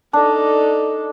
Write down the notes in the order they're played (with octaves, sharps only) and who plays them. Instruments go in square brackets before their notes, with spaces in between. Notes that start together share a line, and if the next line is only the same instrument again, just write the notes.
[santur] D4 [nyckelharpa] D#4 A4